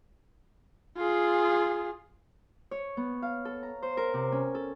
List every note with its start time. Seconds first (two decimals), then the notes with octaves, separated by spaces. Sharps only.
0.98 F4 G#4
2.71 C#5
2.97 B3
3.22 F5
3.45 A4
3.63 A#5
3.82 C5
3.97 A#4
4.14 C3
4.32 C#4
4.55 A4